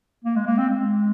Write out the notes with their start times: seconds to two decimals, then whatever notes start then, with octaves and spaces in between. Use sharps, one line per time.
0.24 A#3
0.36 G#3
0.46 A#3
0.58 C4
0.69 G#3